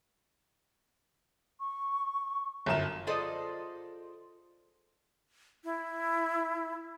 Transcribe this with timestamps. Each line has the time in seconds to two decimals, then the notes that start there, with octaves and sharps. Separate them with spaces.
1.60 C#6
2.66 G1 F#2 E7
3.07 F4 G#4 A4 C5 D5 D#5
5.64 E4